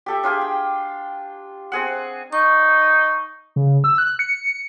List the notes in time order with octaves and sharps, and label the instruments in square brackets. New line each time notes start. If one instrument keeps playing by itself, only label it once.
[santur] G4 A4 E5
D4 F4 G4 G#4
G5
C4 G#4 F#5
[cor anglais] D#4 [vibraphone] C#6
[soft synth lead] C#3
E6
F#6
C#7